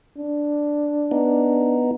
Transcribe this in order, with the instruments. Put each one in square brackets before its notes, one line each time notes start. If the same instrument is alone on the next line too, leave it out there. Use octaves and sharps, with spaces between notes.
[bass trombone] D4
[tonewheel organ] B3 D#4